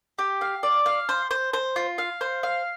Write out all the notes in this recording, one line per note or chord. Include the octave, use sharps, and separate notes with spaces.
G4
F5
D5
F5
C5
C5
C5
F4
F5
C5
F5